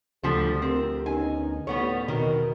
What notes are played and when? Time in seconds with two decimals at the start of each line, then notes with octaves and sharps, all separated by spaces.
0.23 D2 D3 F3 G3 A4
0.62 C4 G4 A#4
1.06 B3 C#4 D#4 G#5
1.67 A1 G3 B3 C#5
2.08 E2 B2 D#3 A#4